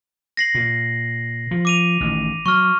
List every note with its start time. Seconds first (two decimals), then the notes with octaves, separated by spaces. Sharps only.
0.37 A#6 C7 F#7
0.55 A#2
1.51 F3
1.65 D6 D#7 F7
2.00 A1 D#3
2.46 F#3 C#6 F6